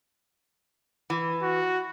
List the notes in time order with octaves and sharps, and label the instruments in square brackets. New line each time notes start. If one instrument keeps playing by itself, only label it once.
[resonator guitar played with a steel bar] E3
[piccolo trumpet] F#4